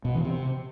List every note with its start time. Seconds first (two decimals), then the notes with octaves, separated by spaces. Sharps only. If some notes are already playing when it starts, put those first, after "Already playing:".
0.05 B2
0.15 E3
0.25 C3